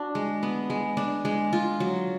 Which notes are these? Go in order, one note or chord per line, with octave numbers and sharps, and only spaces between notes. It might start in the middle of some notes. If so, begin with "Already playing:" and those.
Already playing: D4 F#4
G#3
B3
G#3
D4
G#3
F4
F#3